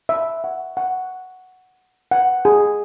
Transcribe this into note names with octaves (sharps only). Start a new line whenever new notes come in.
E5
F#5
F#5
F#5
G#4